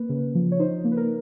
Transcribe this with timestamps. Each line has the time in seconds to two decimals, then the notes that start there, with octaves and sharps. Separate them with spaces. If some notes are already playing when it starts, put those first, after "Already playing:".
Already playing: A#3 B4
0.09 C#3
0.35 F3
0.52 C#5
0.60 D#4 C5
0.85 A#3
0.92 B4
0.97 A#4